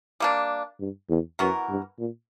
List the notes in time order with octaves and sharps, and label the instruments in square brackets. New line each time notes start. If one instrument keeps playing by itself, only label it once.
[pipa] G3 A#3 D4
[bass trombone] G2
E2
[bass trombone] F#2 [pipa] E3 B3 F#4 A#4
[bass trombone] G2
A#2